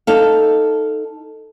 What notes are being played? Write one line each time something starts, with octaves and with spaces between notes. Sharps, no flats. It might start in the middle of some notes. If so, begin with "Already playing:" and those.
D#4 A4 F5